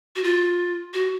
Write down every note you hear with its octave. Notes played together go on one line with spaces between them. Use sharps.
F#4
F4
F#4